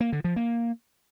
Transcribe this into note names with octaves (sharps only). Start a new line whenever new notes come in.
A#3
D3
F3
A#3